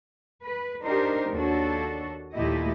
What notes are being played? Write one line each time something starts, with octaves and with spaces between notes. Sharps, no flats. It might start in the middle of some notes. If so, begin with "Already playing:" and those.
B4
D4 D#4 G4 A#4 C5
D#2 D4 F#4 A4 C#5
D#2 A#2 A3 E4 G4 D#5